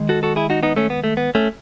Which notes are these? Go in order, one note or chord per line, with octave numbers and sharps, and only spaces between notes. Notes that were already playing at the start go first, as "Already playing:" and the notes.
Already playing: D#3 G#3
F#4 A4
F#4 A4
E4 G#4
D#4 F#4
B3 D#4
A3 C#4
B3
A3
B3
A3 C#4